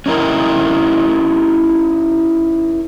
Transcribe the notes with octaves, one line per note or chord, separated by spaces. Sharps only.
C#4 D#4 E4 A#4